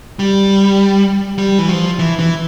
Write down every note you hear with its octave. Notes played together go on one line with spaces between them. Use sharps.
G3
G3
E3
F3
E3
E3